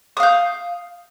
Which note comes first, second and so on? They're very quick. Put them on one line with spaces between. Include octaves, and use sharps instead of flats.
D#6 F5 G6